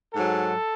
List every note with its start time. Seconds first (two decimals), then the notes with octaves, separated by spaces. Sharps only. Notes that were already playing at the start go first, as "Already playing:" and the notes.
0.14 G#2 F#3 A4